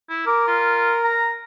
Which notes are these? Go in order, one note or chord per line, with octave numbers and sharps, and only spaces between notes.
E4
A#4 D6
F4
A#5